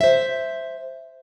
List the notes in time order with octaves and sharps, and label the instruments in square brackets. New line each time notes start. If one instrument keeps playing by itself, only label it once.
[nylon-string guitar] C5 E5